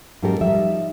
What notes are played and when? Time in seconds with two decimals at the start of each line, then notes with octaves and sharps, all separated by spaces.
0.23 G#2 F#3 C#4 G4 A4 A#4
0.41 F3 G3 D#4 E5